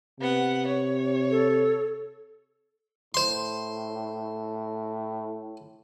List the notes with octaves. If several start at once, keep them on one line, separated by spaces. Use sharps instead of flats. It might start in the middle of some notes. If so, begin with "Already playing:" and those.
C3 B3 F#5
C#5
A4
A2 C5 C6